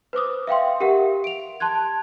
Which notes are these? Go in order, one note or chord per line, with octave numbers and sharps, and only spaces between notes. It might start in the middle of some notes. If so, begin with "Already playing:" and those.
B4 C5 D6 D#6
E5 F5 G5 C6
G4 A#4 E5 F#5
D7 F7
A5 C6 F#6 G#6